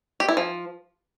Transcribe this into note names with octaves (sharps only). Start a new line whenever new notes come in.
G4
E4
F3